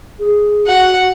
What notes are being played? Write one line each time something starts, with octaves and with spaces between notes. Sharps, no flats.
G#4
F#4 F#5